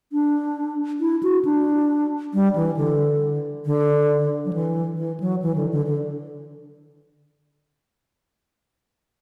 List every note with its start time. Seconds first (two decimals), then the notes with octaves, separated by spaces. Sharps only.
0.13 D4
1.00 E4
1.23 F#4
1.45 D4
2.34 G3
2.55 E3
2.77 D3
3.65 D3
4.45 F#3
4.53 E3
4.97 E3
5.20 F#3
5.42 E3
5.56 D3
5.72 D3
5.86 D3